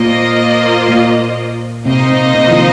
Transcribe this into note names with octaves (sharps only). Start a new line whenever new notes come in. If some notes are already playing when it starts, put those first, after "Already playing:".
Already playing: A#2 A#3 F4 C5 D#5
A#2
C3 A#3 D#4 C5 D#5
C3
C3
F3
D#3